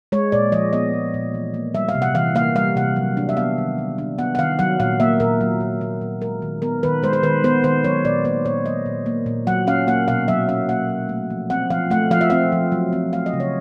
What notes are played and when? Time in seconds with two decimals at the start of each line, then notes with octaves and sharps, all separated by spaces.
0.12 G#3 C#5
0.32 A#2 D5
0.52 F3 D#5
0.73 B3 D#5
0.93 G#3
1.14 A#2
1.34 E3
1.54 A#3
1.75 G3 E5
1.89 F5
1.95 C3
2.02 F#5
2.15 E3 F5
2.35 A#3 F5
2.55 G3 F5
2.76 C3 F#5
2.96 F#3
3.17 D4
3.29 E5
3.37 B3 F5
3.58 D#3
3.78 F#3
3.98 D4
4.18 B3 F#5
4.35 F#5
4.38 D#3 F5
4.59 F#3 F#5
4.80 A#2 F5
5.00 A#3 E5
5.20 A#2 A#4
5.41 F#3
5.61 A#2
5.81 A#3
6.01 A#2
6.21 G#3 A#4
6.42 D#3
6.62 B3 A#4
6.83 D#3 B4
7.03 G#3 C5
7.13 C5
7.23 D#3 B4
7.44 B3 C5
7.64 D#3 C5
7.84 F#3 C#5
8.05 A#2 D5
8.25 A#3 C5
8.45 A#2 C#5
8.66 F#3 D#5
8.86 A#2
9.06 A#3
9.26 A#2
9.47 F#3 F#5
9.67 C#4 F5
9.87 A#3 F#5
10.08 B2 F5
10.28 F#3 E5
10.49 C#4 F5
10.69 A#3 F#5
10.89 B2
11.09 A3
11.30 F3
11.50 C4 F#5
11.70 F3 F5
11.90 A3 F#5
12.11 F3 F5
12.21 E5
12.30 C4 F5
12.52 F3
12.72 F#3
12.93 C4
13.13 A3 F5
13.26 D#5
13.33 C#3
13.40 C#5